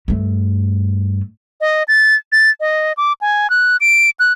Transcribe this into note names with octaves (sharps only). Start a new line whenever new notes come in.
G2 A3
D#5
A6
A6
D#5
D6
G#5
F#6
D7
F#6